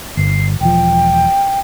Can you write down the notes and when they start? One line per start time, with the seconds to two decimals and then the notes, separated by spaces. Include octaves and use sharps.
0.17 G1 C7
0.61 E1 F3 G5